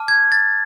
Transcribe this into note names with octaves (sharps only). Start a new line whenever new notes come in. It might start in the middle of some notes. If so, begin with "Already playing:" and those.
Already playing: A5 D6 F6
G#6
A6